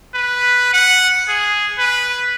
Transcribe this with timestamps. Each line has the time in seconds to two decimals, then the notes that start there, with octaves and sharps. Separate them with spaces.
0.15 B4
0.73 F#5
1.29 G#4
1.79 B4